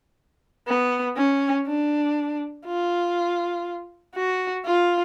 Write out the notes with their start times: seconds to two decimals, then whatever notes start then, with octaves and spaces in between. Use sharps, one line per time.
0.67 B3
1.16 C#4
1.67 D4
2.66 F4
4.15 F#4
4.65 F4